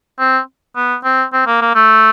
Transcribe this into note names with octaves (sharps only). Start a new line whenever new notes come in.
C4
B3
C4
C4
A#3
A#3
A3